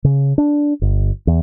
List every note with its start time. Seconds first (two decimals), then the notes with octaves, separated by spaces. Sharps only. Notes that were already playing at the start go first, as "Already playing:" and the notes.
0.04 C#3
0.38 D4
0.82 G1
1.27 E2